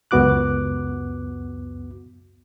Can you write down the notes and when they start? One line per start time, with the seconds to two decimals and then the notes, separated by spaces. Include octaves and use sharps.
0.11 C#2 F#2 B3 F#4 D6 F#6